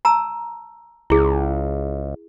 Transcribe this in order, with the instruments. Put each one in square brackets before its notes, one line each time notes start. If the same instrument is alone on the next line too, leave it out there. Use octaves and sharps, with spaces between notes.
[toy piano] A5 A#5 E6
[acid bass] C#2 [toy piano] E4 G#4